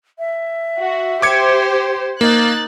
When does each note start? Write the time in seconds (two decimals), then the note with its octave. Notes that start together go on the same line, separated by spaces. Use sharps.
0.19 E5
0.78 F#4
1.22 G4 C5 D6 G#6 C#7
2.21 A#3 D#4 F#6 A6